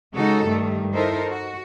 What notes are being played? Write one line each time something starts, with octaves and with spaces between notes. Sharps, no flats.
C#3 G#3 D#4 F#4 A4
G2 D#3 G3 A3
D#4 E4 A4 A#4 C5
F#4